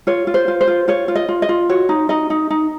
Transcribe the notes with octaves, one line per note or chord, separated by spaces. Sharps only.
F4 C#5
F4
C5
F4
C5
F4
F4 C#5
F4
D#5
F4
D#5
F4
F#4 C#5
D#4
D#4 D#5
D#4
D#4